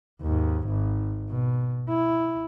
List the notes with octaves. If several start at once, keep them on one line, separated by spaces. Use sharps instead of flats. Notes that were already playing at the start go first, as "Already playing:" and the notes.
D#2 G#2
G#1
B2
E4